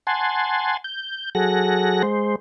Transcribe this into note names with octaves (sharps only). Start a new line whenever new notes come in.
F#5 G#5 A5 C6
G6
F#3 G#4 A4 F#5 A#6
G#3 C5